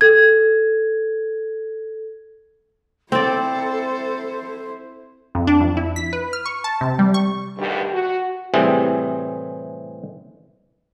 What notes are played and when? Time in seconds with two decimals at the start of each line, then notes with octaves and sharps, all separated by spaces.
0.01 A4 G#6
3.12 C4 E4 A4 C5 D5
5.35 F2
5.47 D4
5.61 F2
5.77 E4
5.96 B6
6.13 B4
6.33 F6
6.46 C#6
6.64 A5
6.81 C3
6.99 G3
7.14 C#6
7.57 D2 G2 B2 D#3 G4
7.92 F#4
8.54 A2 C3 E3 G3 C4 G#4